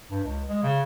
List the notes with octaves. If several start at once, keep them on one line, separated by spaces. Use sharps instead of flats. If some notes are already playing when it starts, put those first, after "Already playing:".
G2
C#2
G#3
C#3